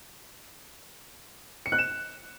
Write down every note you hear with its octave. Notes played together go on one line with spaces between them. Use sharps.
C#7
F#6
E7